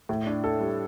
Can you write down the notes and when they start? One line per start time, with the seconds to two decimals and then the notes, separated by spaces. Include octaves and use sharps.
0.09 A2
0.26 D4
0.44 A4
0.60 G3